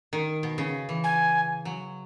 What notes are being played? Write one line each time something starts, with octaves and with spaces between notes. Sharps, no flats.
D#3
B2
C#3
E3
G#5
F#3